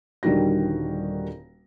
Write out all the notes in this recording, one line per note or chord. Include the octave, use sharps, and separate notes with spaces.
D#1 D3 D#3 G3 F#4 A#6